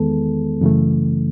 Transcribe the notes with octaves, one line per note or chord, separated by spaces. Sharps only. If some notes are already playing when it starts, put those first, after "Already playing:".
Already playing: E2 D#3 G#3 B3 A4
F#2 C#3 E3 A3